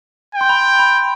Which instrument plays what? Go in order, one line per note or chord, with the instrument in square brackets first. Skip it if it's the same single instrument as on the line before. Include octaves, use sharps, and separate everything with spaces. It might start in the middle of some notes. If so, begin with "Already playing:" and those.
[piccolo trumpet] G5
[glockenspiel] C6
B5
B5